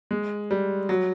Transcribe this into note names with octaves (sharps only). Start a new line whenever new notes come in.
G#3
G3
F#3